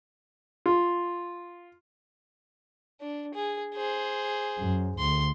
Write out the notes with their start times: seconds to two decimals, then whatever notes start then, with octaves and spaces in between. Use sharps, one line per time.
0.66 F4
3.01 D4
3.34 G#4
3.74 G#4 C5
4.59 F#2
4.99 D2 C6